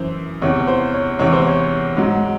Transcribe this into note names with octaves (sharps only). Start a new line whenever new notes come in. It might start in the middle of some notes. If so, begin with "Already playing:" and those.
Already playing: F#2 E3 C5
E2 C3 E3 C#5
C5
C#5
E2 C3 E3 C#5
C5
C#5
G#2 F#3